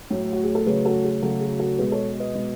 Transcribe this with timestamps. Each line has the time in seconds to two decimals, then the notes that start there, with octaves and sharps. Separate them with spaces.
0.10 A2 F#3 A3
0.33 F#4
0.44 G#4
0.55 A4
0.66 C#3 F#3 A3 G#4 B4
0.85 F#4 A4
1.04 G#4
1.22 C#3 F#3 A3 F#4 A4
1.40 G#4
1.60 F#4 A4
1.78 B2 G#3 G#4 B4
1.92 A4 C#5
2.20 B4 D#5
2.35 B2 G#3